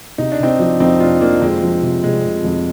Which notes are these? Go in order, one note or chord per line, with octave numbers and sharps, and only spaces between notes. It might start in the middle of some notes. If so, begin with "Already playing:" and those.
C3 D#4
D4
C3 C4 D#4
F3
F2 C4 D#4
F1 D4 F4
F3 A#3 D4
F2 G#3 C4
F3
C3
F1 G#3
F1
F2